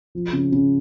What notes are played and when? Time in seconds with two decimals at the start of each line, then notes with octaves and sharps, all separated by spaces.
0.15 F3
0.33 C#3
0.52 C#3